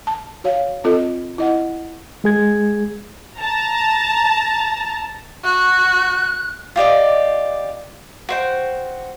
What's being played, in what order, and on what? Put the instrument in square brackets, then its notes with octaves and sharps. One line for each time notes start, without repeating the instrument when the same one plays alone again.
[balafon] A5
F#4 C#5 F5
C4 F4 A4 D#5
E4 D#5 F#5
[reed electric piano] G#3 G#4 G#6
[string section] A5 A#5
[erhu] F#4 [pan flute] F#6
[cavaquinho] F4 G4 D5 D#5
F#4 C5 G5